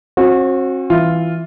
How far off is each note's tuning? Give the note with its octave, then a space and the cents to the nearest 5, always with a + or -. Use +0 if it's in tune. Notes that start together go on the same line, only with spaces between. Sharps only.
C4 +40 F#4 -25
E3 +0 F4 +0